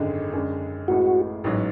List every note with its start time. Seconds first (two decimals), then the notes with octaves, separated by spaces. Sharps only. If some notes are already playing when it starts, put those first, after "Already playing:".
Already playing: G#1 F#2 D3 G#3
0.33 F#2 D3 G#3
0.88 A1 A2 G#3 F#4
1.44 A1 G#2 F#3